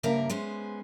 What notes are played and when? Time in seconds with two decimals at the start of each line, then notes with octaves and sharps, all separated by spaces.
0.03 G2 C#3 A#3 A#4 E5
0.30 G#3 B3 C#4 C5